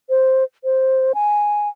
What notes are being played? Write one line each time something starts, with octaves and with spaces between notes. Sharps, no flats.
C5
C5
G#5